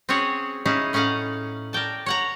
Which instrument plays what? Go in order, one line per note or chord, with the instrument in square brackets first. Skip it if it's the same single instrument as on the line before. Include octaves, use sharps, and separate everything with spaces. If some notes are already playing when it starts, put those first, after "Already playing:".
[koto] C4 C#4 F#4 G#4 C#5 F#5
C#4 D#4 E4 G#4 F5
A2 C#4 D#4 F5 F#5
A#4 D5 G5 A5
C#5 F#5 A#5